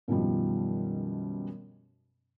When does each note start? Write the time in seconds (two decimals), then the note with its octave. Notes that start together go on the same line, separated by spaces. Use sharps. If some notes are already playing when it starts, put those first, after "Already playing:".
0.08 F#2 B2 D#3 F3 G3